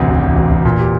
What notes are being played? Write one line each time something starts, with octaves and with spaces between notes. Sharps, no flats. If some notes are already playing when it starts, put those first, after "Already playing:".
Already playing: A1 D2 C3
E1
D2
E1
E1
A#2
G4